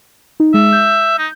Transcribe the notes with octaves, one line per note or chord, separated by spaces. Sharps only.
D#4
G#3 E5
G6
D#4